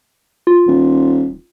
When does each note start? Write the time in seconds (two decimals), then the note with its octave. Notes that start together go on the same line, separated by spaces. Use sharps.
0.47 F4
0.67 D#1